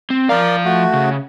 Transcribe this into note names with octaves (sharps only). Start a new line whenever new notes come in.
C4
F3 A#4 D5 F5
A3 F#4
C#3